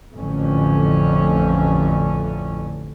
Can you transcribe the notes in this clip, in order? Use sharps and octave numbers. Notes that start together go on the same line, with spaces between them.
A1 F2 D3 C#4